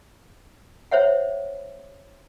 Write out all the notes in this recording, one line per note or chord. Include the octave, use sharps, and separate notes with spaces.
C5 C#5 E5 F#5